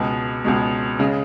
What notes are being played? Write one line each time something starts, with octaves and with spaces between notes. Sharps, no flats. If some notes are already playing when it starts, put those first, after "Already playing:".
Already playing: C#2 B2 G#3
C#2 B2 G#3
C#3 G#3